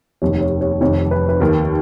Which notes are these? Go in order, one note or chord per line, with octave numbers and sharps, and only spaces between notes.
F1 D#2 D#3 C#5
C#5
C#5
F1 F2 D#3 C#5
B4
B4
D#2 D#3 A#4